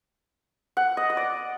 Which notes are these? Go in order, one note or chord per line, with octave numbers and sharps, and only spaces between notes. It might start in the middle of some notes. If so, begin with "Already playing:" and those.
F#5
D#5
D#5
D5